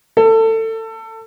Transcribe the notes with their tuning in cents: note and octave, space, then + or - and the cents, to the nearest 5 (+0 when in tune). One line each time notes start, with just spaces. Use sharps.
A4 +25